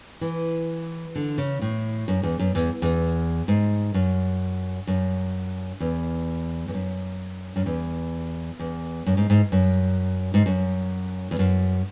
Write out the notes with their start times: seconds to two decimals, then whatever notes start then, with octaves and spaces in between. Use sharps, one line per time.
0.21 E3
1.15 D3
1.38 C#3
1.62 A2
2.08 F#2
2.23 E2
2.39 F#2
2.55 E2
2.82 E2
3.48 G#2
3.94 F#2
4.87 F#2
5.80 E2
6.68 E2
6.74 F#2
7.56 F#2
7.66 E2
8.59 E2
9.06 F#2
9.17 G#2
9.30 G#2
9.52 F#2
10.34 G#2
10.46 F#2
11.31 E2
11.39 F#2